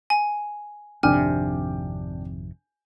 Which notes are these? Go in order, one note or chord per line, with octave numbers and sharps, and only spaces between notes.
G#5
G#1 F2 C3 D4 G5 G#5 D6 F6